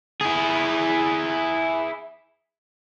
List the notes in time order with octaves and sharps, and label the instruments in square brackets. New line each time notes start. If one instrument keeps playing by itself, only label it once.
[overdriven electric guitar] E4 G#4